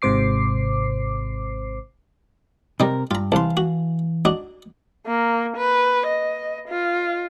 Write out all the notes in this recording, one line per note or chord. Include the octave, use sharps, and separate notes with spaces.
G#1 G#2 C3 C5 D6 C7
C3 G3 D#4 A#4
G2 F4 A#5
C2 E3 F5 A5 C6
F#4
D4 D#4 F#4
A#3
B4
D#5
F4